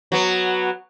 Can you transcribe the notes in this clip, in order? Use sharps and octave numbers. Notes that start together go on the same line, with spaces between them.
F#3 B3